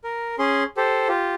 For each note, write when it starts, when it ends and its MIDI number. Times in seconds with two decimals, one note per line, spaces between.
0.04 0.36 70
0.39 0.64 61
0.39 0.64 68
0.39 0.64 84
0.77 1.08 67
0.77 1.08 69
0.77 1.08 72
1.08 1.35 65
1.08 1.35 67